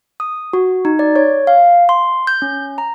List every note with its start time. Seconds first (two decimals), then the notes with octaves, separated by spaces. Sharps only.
0.20 D#6
0.53 F#4
0.85 D#4
0.99 D5
1.16 C#5
1.47 F5
1.89 C6
2.27 G6
2.42 C#4
2.78 A#5